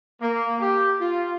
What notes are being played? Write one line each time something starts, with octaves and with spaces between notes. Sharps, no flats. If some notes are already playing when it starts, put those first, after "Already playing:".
A#3
G4
F4